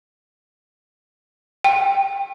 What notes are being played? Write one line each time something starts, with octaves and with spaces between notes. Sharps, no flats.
G5